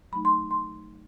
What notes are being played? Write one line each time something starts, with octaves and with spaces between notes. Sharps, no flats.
F#3 A3 D#4 B5
C6
C6